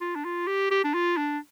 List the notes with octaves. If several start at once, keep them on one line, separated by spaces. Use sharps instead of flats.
F4
D4
F4
G4
G4
D4
F4
D4